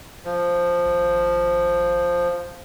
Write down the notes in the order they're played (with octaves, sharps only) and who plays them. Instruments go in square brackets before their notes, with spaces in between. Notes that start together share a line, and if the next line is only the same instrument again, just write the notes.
[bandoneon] F3
[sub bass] G#1